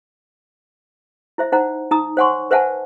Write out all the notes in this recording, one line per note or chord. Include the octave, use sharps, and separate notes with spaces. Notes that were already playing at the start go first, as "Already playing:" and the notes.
E4 C5 E5
D#4 C5 F#5 A#5
D#4 A#5 D#6
C5 C#5 F#5 G#5 C6 C#6
B4 C5 E5 F#5 G#5 A5